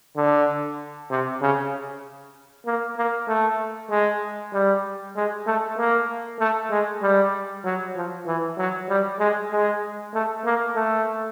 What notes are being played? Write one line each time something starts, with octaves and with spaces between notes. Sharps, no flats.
D3
C3
C#3
A#3
A#3
A3
G#3
G3
G#3
A3
A#3
A3
G#3
G3
F#3
F3
E3
F#3
G3
G#3
G#3
A3
A#3
A3